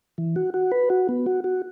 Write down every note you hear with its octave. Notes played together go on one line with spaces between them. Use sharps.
E3
F#4
F#4
B4
F#4
B3
F#4
F#4